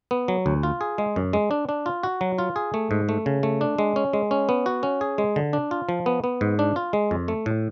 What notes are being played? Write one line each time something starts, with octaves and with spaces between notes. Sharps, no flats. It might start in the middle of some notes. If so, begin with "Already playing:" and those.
B3
F#3
D2
F4
G#4
G#3
F#2
G#3
D4
D4
F4
F#4
F#3
F4
G#4
A3
G#2
A3
C#3
A3
D4
G#3
C#4
G#3
C#4
B3
F#4
C#4
G#4
G#3
D3
D4
F4
F3
B3
B3
G#2
D4
F4
G#3
F2
A3
A2